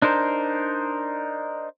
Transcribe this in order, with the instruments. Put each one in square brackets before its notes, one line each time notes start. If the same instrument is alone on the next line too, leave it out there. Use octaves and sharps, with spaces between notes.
[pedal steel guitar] D4 D#4 A#4 C5